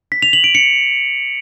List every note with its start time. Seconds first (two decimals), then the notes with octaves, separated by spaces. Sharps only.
0.12 B6
0.22 F7
0.33 F#7
0.44 D7
0.55 C#7